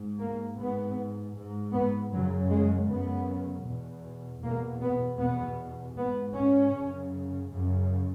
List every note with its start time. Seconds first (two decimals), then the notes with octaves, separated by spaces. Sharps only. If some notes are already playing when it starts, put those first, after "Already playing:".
Already playing: G#2
0.19 A#3
0.58 G#2 B3
1.35 G#2
1.73 B3
2.11 F#2 C#3 F#3
2.50 G#3
2.88 F#2 C#3 B3
3.65 E2 B2
4.43 E2 B2 A#3
4.81 B3
5.19 E2 B2 B3
5.95 G#2 B3
6.35 C#4
6.73 F#2 C#3
7.49 F#2 C#3